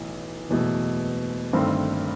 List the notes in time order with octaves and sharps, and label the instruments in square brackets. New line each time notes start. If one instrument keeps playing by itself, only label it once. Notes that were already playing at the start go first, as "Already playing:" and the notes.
Already playing: [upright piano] B1 A2 E3
F#1 E2 B2 A3
G1 G2 D#3 A3 C4